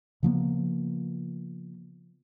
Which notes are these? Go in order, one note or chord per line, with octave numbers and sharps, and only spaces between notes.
C#3 F3 A#3 B3